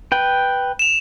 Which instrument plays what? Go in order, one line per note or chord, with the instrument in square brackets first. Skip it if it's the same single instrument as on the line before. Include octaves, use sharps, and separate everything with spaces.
[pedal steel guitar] B4 G5
[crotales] E7 F7